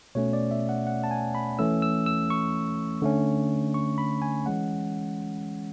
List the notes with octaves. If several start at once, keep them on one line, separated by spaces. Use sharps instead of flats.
B2 A3 C#4 C#5
D5
E5
F#5
F#5
A5
G#5
B5
E3 A3 C#4 E6
E6
E6
C#6
D3 A3 C#4
C#6
B5
G#5
E3 G#3 C#4 F#5